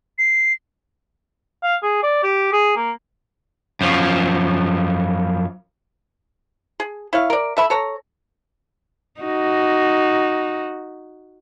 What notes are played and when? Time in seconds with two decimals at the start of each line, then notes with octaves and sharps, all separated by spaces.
0.19 C7
1.63 F5
1.83 G#4
2.03 D5
2.23 G4
2.53 G#4
2.76 A#3
3.81 F#2 F3
6.80 G#4
7.13 E4 C#5 F5
7.30 A#4 D5
7.57 A3 E5 B5
7.70 A4 C#5 A#5
9.21 D#4 F#4